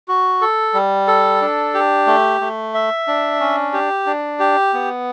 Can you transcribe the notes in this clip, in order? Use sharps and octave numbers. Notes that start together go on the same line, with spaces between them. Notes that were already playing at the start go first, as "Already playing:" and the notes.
F#4
A4
G3
A4
D4
G4
A3
A3
E5
D4
C#4
G4
D4
G4
B3